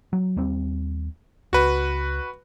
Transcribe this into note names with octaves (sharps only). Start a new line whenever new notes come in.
F#3
D#2 G3 C4
C#2 F#4 B4